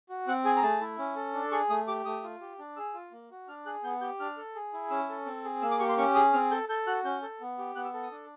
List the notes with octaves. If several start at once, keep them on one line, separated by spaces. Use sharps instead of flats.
F#4
C4 F#5
G#4 G#5
A#5
A3 A5
E4
C#4
A4
D4
G#4 C#6
A3 D#6
G4 D6
A3 D#6
F4
G4
D4
G#4 E6
F4
A#3
F#4
D4 F6
G#4 F#6
B3 G6
G4 G6
D4 F6
A4
G#4
E4
C#4 E6
A4
C4
G#4
A#3 E6
D6
G4 C#6
C6
C#4 C#6
G#4 D#6
C4 F6
A4 G6
A4 G6
F#4 F#6
C#4 G6
A4
B3
G4
B3 F#6
E6
A4
D#6
D4